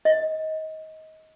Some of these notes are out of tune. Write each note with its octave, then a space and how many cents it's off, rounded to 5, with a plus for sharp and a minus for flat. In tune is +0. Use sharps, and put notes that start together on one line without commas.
D#5 +20